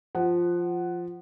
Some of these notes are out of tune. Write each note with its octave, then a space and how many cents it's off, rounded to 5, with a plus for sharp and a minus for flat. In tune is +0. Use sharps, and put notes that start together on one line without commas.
F3 +0 F#5 +5